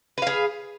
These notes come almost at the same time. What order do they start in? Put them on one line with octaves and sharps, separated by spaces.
B4 F5 G#4